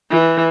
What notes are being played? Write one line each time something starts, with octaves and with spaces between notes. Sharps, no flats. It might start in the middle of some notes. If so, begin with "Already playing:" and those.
E3